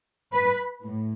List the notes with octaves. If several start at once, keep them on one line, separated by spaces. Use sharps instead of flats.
B4
A2